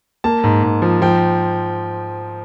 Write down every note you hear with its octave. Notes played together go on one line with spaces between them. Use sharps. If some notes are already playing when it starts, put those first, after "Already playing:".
A#3 A5
G#2
G#2
F3
F3 G5